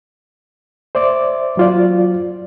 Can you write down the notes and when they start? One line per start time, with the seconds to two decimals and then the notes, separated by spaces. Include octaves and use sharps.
0.95 C5 D5 E5 D6
1.57 F#3 F4 D5